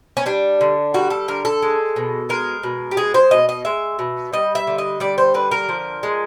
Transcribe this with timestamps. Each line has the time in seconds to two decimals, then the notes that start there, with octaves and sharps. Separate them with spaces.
0.17 C#4
0.26 G3 D4
0.61 D3
0.94 G3 F#4
1.10 A4
1.28 D3 A#4
1.45 A4
1.62 G#3
1.96 B2
2.29 G#3 A#4
2.63 B2
2.91 G4
2.97 G#3 G#4
3.14 C5
3.31 B2 D#5
3.49 D#5
3.65 G#3 E5
3.99 B2
4.33 G3 D#5
4.55 E5
4.67 D3
4.78 D#5
5.00 G3 D5
5.18 C5
5.34 D3 B4
5.51 A#4
5.69 F3
6.03 G#3